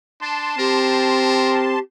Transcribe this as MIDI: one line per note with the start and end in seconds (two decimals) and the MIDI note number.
0.22 0.54 62
0.22 1.79 81
0.22 1.79 84
0.58 1.78 60
0.58 1.80 67
0.58 1.74 70